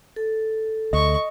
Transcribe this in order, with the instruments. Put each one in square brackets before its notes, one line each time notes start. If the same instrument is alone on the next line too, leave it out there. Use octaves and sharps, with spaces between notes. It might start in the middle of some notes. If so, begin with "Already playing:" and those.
[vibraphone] A4
[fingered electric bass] D2 [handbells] D#5 [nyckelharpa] C#6